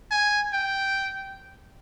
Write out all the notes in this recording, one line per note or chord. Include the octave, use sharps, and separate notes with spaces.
G#5
G5